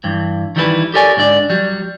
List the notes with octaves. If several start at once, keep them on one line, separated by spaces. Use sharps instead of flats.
G2 E3
D#3 E3 G3 E4 F#4 B4
G4 A4 A#4 C#5 D5 G#5
G#2 D3 D4 D5
F#3 G3